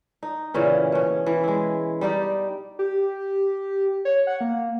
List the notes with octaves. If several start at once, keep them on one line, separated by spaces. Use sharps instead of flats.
D#4
A#2 C#3 E3 C#4
B2 C#4
E3
G#3 E4
G3 D#4 G4 D5
G4
C#5
F#5
A#3